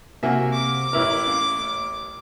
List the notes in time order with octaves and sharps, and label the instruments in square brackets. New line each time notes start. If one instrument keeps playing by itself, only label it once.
[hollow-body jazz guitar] C3 A#4 G#5 [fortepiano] A#3 F#4 E5
[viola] D6
[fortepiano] A1 E4 A#4 [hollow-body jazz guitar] B4
[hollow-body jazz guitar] C#4 F5